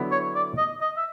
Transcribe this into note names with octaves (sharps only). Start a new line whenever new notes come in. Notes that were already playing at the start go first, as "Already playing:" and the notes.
Already playing: D3 F#3 B3 E4
C#5
D5
D#5
D#5
E5